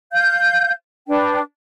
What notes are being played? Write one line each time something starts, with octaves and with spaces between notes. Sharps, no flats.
F5 G6
D4 B4 G5